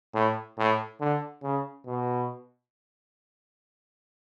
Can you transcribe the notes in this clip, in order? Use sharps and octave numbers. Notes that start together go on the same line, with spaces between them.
A2
A2
D3
C#3
B2